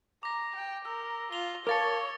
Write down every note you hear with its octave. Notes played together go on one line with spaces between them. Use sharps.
A#5 D6 A#6
G5
A#4 E6
F4 F7 G7
A#4 C#5 F5 A5 D6 A6 C#7